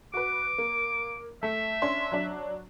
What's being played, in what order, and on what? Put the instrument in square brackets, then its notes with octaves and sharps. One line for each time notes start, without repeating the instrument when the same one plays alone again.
[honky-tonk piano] F#4 B4 [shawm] D6
[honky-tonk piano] A#3
[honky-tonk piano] A3 [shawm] E5
[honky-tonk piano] C#4 D4 C6
F#3 D4